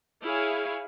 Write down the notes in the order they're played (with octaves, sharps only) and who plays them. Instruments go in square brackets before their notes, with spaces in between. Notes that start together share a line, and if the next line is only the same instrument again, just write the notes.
[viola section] E4 G#4 C#5 F5 G#5